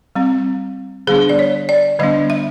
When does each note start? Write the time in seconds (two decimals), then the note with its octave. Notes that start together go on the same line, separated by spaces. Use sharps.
0.15 G3 C4
1.07 D3 G3 B3 D4 G#4
1.29 D5
1.39 C#5
1.69 D5
1.99 D3 G3 B3 D4 D#5
2.30 E5